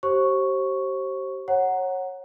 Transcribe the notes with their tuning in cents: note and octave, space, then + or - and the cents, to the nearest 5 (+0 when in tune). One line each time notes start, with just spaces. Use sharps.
G4 -35 C5 +35 C#6 +0
C#5 -20 F#5 +0 A#5 +0